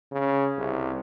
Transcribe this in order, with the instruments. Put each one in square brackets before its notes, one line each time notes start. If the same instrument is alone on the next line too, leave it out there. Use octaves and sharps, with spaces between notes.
[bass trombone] C#3
C2